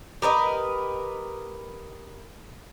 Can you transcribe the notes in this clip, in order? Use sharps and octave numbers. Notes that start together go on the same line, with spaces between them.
G4 A#4 B4 D#5